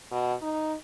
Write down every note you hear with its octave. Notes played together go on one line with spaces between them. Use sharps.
B2
D#4